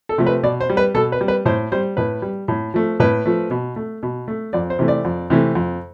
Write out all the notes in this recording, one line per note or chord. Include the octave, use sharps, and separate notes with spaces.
A4
C3 F3 A3
B4
B2 D5
C5
G3
B4
B2 A4
B4
G3
B4
A2 C5
G3 C5
A2 B4
G3
A2
F3 A3
A2 B4
F3 A3
B2
A3
B2
A3
F2 D5
C5
C3 E3 A3
D5
F2
C3 E3 A3
F2